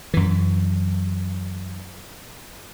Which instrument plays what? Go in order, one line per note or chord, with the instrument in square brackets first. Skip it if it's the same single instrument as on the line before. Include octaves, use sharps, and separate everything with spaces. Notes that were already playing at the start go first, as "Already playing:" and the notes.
[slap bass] F#2 E3